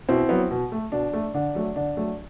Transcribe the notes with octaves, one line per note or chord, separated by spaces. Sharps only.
B2 C4 E4
F#3 B3
B2
A3
B2 D4
A3
D3 D4
F#3 A3
D3 D4
F#3 A3